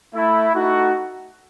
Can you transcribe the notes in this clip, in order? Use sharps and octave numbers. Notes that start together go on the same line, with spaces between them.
A3 E4
A3 D#4 F#4